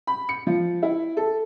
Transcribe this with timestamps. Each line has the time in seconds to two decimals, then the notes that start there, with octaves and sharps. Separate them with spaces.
0.07 B5
0.29 C#7
0.47 F3
0.83 E4
1.17 A4